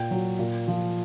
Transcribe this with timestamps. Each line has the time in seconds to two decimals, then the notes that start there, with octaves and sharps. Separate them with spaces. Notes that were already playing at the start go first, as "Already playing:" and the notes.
Already playing: A#2 G5
0.11 F#3
0.39 A#2
0.68 F3